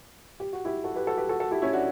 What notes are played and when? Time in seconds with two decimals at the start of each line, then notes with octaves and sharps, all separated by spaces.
0.40 G4
0.53 F#4
0.65 E4 G4
0.84 F#4 A4
0.96 G4 B4
1.07 F#4 A4
1.17 G4 B4
1.29 F#4 A4
1.40 F#4 A4
1.51 E4 G4
1.62 C#4 E4
1.73 D4 F#4